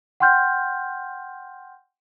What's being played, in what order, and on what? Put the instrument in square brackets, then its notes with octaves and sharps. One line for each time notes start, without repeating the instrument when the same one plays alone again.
[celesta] F#5 G5 C6 F6 G6